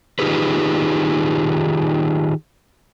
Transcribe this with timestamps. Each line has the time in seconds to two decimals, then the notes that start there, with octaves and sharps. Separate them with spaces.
0.19 D#3 D#4 F4 G4 G#4 B4